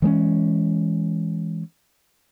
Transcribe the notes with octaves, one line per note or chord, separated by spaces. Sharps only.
E3 G#3 A3 C#4